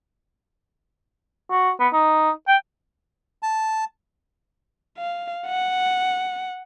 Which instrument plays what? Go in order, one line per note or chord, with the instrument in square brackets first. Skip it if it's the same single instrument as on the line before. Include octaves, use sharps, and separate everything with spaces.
[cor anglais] F#4
B3
D#4
G5
[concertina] A5
[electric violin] F5
F#5